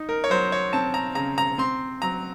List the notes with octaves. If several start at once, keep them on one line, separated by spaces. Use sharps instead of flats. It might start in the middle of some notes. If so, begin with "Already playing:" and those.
Already playing: D#4
A#4
C#5
F#3 C5
C#5
C4 A5
A#5
C#3 A#5
A#5
C4 C6
F#3 A#5